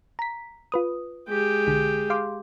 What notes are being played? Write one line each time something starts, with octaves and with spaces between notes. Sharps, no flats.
A#5 B6
F4 B4 D#6
G#3 G4
B1 D3
F5 C6 D6